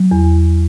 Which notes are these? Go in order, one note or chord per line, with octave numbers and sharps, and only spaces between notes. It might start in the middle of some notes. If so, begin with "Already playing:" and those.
Already playing: F#3
E2